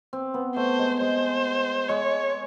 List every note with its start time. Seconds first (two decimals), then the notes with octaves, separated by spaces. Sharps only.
0.13 C4
0.34 B3
0.56 A3 C5
0.79 G#3
1.01 G#3 C5
1.89 G#3 C#5